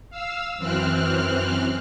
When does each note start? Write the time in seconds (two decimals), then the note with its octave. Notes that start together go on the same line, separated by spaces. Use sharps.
0.10 F5 E6
0.57 F#2 E3 C4 F6 F#6